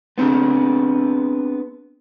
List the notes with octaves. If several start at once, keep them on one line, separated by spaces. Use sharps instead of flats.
B3 C4 D4 G#4